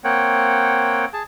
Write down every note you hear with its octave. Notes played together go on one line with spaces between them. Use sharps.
A#3 C4 C#5 F#5 G5
G#4 A5